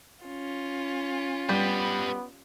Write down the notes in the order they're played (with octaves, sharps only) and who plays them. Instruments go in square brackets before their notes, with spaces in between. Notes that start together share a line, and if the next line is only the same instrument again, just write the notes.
[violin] C#4 F4
[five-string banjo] G3 [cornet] B3 [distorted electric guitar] G4 B4